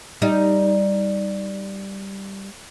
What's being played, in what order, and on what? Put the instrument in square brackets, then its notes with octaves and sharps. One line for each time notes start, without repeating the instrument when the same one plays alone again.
[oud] G3 D#4